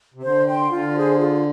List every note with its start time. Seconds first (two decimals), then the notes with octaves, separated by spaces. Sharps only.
0.14 C3
0.22 D3 C5
0.47 G5 C6
0.71 D3 F4
0.95 G#4 C5
1.18 F4